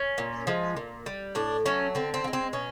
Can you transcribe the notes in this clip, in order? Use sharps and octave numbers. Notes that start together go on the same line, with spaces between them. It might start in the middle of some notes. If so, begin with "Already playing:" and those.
Already playing: C#4
A#2
F3 G#3
A#2
G3
A2 D4
F#3 A3 C#4
D3 C4
C4
F3
G#3
C4
B2 C#4